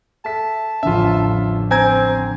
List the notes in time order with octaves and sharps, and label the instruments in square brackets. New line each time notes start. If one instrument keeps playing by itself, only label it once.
[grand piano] A4 E5 B6 [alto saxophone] A5
[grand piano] A1 F2 D3 [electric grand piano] F4 E5
[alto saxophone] C4 [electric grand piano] G#5 A#5 G#6